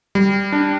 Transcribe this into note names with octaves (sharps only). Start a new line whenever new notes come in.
G3
D4